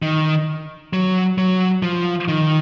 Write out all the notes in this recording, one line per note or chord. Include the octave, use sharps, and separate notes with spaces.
D#3
F#3
F#3
F3
D#3